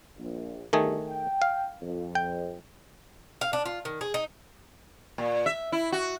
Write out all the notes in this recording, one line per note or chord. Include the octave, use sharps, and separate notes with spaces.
A#1
G1 D#3 A3 G4 G#4 D#5
G5
F5
F2
G5
F5
D4
F4
D#3
G#4
D#4
A#2
E5
E4
F#4